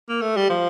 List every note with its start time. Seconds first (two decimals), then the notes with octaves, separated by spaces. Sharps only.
0.09 A#3
0.22 A3
0.37 G3
0.50 F3